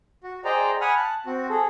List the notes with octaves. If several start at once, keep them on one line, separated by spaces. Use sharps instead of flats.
F#4
G#4 C5 D5 D#5 G5 A#5
F#5 G#5 B5 D#6 F6
A5 F#6
C4 F#4
G#4 A4